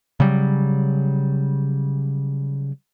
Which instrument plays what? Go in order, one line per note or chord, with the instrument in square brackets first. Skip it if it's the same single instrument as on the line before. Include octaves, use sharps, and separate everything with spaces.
[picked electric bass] C#3 F#3 G3